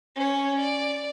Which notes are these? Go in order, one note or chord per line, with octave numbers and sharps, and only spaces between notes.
C#4 C#5
D5